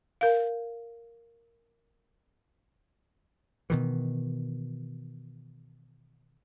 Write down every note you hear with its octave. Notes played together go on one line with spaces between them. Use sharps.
A#4 F5
B2 D#3 E3